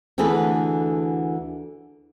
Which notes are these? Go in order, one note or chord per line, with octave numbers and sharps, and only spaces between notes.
D2 D3 E3 G#4 A4 B4